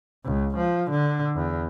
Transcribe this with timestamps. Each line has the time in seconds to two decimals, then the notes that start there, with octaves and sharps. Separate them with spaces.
0.25 C#2
0.57 F3
0.90 D3
1.36 E2